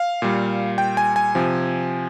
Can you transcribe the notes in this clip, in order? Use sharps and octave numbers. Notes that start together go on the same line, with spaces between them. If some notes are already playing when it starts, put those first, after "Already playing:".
Already playing: F5
A#2 G3
G5
G#5
G#5
C3 F3